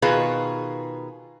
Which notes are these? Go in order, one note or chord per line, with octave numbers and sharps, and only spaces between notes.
B2 D#3 F4 G#4 B4